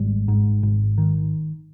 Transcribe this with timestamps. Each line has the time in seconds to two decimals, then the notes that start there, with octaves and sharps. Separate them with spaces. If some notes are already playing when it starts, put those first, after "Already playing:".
Already playing: G#1 G3
0.28 G#2
0.63 G#1
0.98 D#3